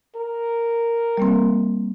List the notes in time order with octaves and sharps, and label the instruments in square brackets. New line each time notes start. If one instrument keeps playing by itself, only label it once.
[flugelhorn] A#4
[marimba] G3 A#3 C4